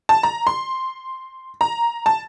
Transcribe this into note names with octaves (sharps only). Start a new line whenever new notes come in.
A5
A#5
C6
A#5
A5